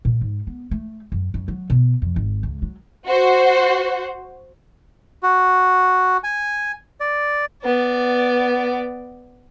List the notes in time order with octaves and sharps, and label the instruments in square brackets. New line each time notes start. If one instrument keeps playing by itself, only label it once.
[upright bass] A#2
G#2
B3
A3
F#2
F#2
F#3
B2
F2
G#1
C#2
F#3
[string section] F#4 C5
[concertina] F#4
G#5
D5
[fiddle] B3 D5